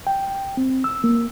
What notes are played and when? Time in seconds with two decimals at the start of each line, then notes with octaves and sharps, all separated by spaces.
0.07 G5
0.57 C4
0.84 E6
1.04 A#3